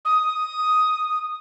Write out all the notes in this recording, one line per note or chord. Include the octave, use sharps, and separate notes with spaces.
D#6